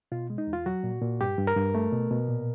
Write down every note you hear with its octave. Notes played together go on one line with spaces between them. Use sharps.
B2 F4
G#3
D#4
E2
F4
F#3 F#4
A#2
A#2
G2 G4
G2
A#4
G2
A3
B2
B2
A#2